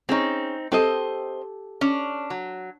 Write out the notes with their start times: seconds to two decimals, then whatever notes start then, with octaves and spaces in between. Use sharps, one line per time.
0.09 C4 C#4 D#4 G#4
0.72 C4 G4 A4 C5 D#5
1.81 C#4 D4
2.30 F#3